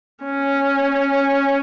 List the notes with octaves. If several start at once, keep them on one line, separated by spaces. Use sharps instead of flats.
C#4